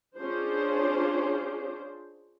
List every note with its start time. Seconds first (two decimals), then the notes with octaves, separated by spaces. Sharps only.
0.18 C#4 D4 F4 G#4 C5